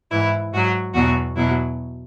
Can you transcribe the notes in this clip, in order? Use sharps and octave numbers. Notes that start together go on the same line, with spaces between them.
G#2 E3 E4
G#2 F#3 F#4
E2 B2 F#3 F#4
E2 B2 F#3 E4